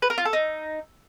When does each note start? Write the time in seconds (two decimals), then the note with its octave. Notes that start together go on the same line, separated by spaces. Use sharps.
0.02 B4
0.10 A#4
0.18 F4
0.25 A4
0.33 D#4